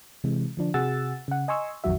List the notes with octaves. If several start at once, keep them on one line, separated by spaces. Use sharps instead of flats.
C3 E3 G#3
D3 F3 D4
C3 F#4 G#4 F#5 E6 A6
C#3 F#5
D#5 G#5 C6 C#6 E6
A#1 F2 D#3 F#3 F#4 E5